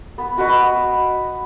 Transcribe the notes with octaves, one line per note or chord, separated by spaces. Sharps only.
B3
F#4 B4 D#5
B3